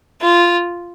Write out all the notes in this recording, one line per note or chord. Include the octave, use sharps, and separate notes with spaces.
F4